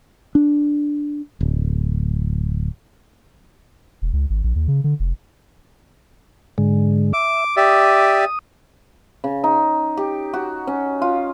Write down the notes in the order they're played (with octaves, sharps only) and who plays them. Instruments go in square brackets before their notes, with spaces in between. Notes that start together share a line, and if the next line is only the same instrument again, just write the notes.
[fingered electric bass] D4
D1
[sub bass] E1
C#2
G#1
A#1
D#2
C#3
D3
F1
[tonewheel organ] G#2 D3 G#3
[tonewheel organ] E5 [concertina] D6
[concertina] G4 D5 E5 [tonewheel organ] D#6
[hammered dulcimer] C#3
D#4
G4
F#4
C#4
F4